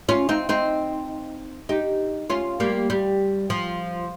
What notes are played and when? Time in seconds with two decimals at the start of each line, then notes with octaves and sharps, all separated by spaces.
0.09 C#4 F4
0.29 C4 D#4
0.49 C4 D#4
1.69 D#4 G4
2.30 C#4 F4
2.60 G3 A#3
2.90 G3
3.50 F3